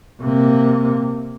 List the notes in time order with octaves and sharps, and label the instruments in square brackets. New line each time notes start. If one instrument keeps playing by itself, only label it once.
[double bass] C3 A#3